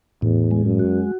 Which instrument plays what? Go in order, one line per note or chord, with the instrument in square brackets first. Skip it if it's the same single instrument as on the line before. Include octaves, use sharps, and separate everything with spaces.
[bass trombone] E2 [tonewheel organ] A2
[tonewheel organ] G#3
[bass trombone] F#2
[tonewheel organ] F#4